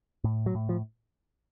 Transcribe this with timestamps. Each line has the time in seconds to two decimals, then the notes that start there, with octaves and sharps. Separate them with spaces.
0.24 A2
0.46 F#3
0.55 A2
0.69 F3